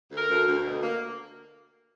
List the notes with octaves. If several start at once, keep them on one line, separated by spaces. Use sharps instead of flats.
D2
A#4
D2
D2
B2
A#3